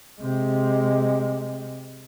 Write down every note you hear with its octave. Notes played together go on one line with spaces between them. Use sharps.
C3 G#3